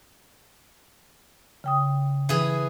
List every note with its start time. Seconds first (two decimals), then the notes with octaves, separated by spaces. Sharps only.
1.64 C#3 G5 D#6
2.29 E3 G#4